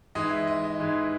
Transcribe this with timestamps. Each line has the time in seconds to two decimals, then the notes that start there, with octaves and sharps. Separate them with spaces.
0.15 G#2 E3 G#3 D#5
0.31 E5
0.47 D#5
0.64 D#5
0.79 G#2 E3 G#3